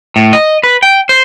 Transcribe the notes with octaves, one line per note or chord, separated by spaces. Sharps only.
A2
D#5
B4
G5
C5